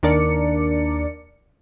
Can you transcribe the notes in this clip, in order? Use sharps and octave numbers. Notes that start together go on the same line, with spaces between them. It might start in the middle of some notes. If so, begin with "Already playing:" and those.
D#2 D4 A#4 D5 C#7